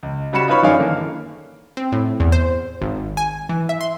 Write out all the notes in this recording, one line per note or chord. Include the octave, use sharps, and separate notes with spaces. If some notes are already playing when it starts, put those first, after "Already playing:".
C#2
C#3 G3 F#4 B5 C#7 E7
D#4 F4 B4 C#5 B5 C#6
F#2 D#3 C#4 G#4 D5 F5
D3 E3 A#3
C4
A2
E2
C5
G#1
G#5
E3
E5
C6